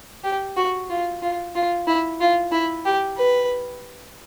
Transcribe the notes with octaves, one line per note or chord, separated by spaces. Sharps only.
G4
F#4
F4
F4
F4
E4
F4
E4
G4
B4